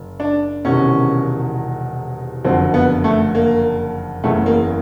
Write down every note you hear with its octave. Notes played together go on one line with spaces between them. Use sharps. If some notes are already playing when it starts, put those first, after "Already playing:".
Already playing: F#1
D4
E1 E2 C3 D#3 C#4
F#1 F2 D3 F#3 C4
B3
A3
A#3
F#1 E2 C#3 A3
A#3